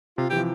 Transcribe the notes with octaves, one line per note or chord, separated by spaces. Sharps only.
C3 F4
E3 G4
F3